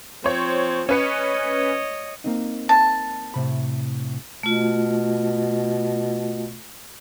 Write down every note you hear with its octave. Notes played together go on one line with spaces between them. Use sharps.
F3 C4 C5 C#5
C#4 B4 C#5 D#5 C#7
A#3 C4 D#4
A5
A2 C3 B5
B2 A3 F4